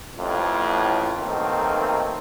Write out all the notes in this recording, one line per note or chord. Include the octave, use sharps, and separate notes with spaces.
A1 F2 A2
B1 D#3 A3 A#3 C4